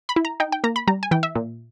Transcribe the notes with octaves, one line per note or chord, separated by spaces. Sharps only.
B5
E4
A#5
D#4 G5
G5
A#3 A#5
B5
G3 A#5
G#5
E3 G5
E5
A#2